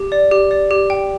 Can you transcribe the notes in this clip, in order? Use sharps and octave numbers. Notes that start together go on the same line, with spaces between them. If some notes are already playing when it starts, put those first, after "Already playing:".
Already playing: G4
D5
G4
D5
G4
G5